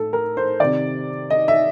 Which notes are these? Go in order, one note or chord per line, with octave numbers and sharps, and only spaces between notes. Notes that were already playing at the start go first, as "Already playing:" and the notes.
Already playing: A2 A4
A#4
C5
C3 D#3 D5
D#5
E5